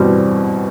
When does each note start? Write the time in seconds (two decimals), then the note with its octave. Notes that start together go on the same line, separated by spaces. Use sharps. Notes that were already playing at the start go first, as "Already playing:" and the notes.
Already playing: E2 B2 G3 C4